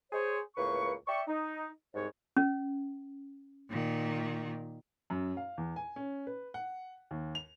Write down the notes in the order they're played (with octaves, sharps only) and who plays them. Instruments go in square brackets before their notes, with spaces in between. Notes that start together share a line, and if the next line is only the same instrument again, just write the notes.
[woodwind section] G#4 C5 C#5
C#2 A2 A#3 B4 C#6
D5 E5 G5 C#6
D#4
C2 G#2 C#5
[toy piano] C#4
[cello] A#2 D#3
[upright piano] F#2
F5
E2
G#5
C#4
B4
F#5
D#2
F7